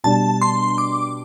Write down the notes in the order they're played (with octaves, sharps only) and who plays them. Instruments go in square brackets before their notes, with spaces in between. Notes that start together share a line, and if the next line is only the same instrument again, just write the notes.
[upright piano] B2 G3 D4 [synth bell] A5
[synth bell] C6
D6